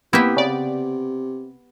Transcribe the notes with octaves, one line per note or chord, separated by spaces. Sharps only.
C3 A#3 B3 E4 G4
C#3 D5